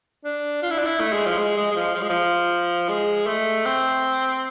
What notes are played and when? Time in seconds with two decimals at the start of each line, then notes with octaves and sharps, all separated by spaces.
0.25 D4
0.63 F4
0.70 E4
0.78 D4
0.86 E4
1.00 A3
1.13 G#3
1.25 F3
1.37 G#3
1.57 G#3
1.71 G#3
1.76 F3
1.95 F3
2.02 G#3
2.09 F3
2.89 G#3
3.27 A3
3.65 C4